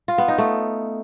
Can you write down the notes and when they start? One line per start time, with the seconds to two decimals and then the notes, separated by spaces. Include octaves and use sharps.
0.08 F4
0.18 B3
0.28 D#4
0.38 A3